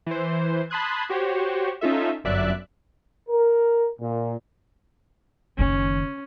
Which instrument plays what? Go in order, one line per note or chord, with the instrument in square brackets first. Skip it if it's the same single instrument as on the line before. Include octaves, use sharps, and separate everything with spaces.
[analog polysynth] E3 C5
A5 B5 C6 D#6 F#6 G#6
F#4 G4 C5 C#5
C#4 D#4 F4 A4 E5
G1 F#2 D5 E5 F#6
[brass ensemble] A#4
A#2
[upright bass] F#1 D#3 [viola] C#4